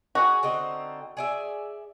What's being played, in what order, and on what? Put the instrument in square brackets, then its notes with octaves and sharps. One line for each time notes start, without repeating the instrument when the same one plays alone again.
[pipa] F#4 [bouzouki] G#4
[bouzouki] D3 C4 D#4
G#4 D5 E5